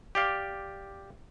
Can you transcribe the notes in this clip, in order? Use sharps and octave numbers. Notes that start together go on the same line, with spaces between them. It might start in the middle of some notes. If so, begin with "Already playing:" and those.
G4 D5 F5